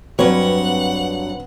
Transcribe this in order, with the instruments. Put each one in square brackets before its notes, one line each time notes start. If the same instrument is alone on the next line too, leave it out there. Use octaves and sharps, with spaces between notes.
[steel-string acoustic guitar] G2 C#5 [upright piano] F#3 [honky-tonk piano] C4 B4 [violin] F#5